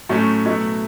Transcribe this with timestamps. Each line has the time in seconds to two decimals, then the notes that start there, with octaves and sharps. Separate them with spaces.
0.09 A2 F#3 A3 C#4
0.44 B2 F#3 A3 E4